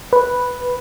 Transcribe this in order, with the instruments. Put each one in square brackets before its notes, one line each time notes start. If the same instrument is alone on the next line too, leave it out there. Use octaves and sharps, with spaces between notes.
[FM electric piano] B4